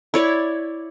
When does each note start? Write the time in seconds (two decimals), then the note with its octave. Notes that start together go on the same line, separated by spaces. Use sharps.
0.14 E4 C#5 D5